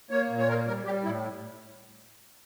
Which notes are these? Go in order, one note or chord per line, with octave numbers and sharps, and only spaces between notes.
A#3 C#5
A#2
C#5
A#3 A#4
G3 A#4
G3 G4
A2 E4